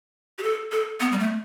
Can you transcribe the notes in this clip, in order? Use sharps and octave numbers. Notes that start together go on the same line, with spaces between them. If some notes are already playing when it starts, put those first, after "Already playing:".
G4
A4
A4
B3
G3
A3